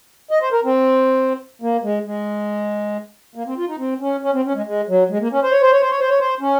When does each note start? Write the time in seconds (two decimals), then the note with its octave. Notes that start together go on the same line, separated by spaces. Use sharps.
0.31 D#5
0.41 C5
0.52 A#4
0.64 C4
1.62 A#3
1.83 G#3
2.06 G#3
3.36 A#3
3.47 C4
3.58 F4
3.68 D#4
3.79 C4
4.01 C#4
4.23 C#4
4.34 C4
4.45 C#4
4.55 G#3
4.66 G#3
4.88 F#3
5.10 G#3
5.21 A#3
5.32 C#4
5.43 C5
5.52 C#5
5.62 C5
5.72 C#5
5.81 C5
5.90 C#5
6.00 C5
6.09 C#5
6.20 C5
6.41 C#4